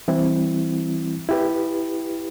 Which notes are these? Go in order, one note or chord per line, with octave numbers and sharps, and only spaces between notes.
E3 G3 C4 E4
E4 G4 B4